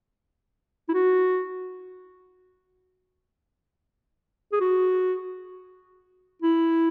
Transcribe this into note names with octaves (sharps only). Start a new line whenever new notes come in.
E4
F#4
G#4
F#4
E4